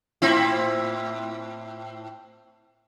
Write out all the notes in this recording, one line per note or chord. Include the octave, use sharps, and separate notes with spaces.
A2 C4 E4